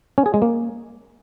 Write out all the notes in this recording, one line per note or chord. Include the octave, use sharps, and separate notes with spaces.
C#4
G#4
G#3
A#3